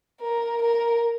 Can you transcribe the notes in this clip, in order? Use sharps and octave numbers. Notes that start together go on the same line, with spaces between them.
A#4
A#4